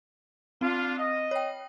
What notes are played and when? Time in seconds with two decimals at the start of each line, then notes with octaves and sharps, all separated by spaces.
0.61 C4 D4 F4
0.97 D#5
1.31 C#5 G5